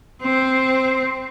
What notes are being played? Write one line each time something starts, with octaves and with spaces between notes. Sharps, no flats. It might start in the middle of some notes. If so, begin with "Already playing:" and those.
C4